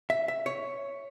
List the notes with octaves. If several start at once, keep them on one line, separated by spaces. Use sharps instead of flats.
E5
E5
C#5